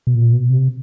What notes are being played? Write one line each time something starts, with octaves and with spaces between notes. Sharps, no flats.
B2
A#2
B2
C3